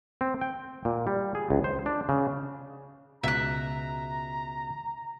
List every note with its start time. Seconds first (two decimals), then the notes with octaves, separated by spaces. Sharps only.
0.21 C4
0.41 G5
0.85 A#2
1.07 G3
1.35 G#4
1.50 C#2
1.64 C5
1.86 D4
2.09 C#3
3.23 C#2 B2 E5 A#5 F#6